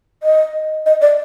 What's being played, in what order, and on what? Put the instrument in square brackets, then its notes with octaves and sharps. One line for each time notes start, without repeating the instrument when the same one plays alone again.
[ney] D#5
D#5
D5